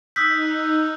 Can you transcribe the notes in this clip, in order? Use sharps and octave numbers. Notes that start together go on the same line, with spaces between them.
D#4 D#6 E6 F#6 G6 B6